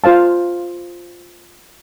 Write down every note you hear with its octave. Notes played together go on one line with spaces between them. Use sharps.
F4 C5 F5 A5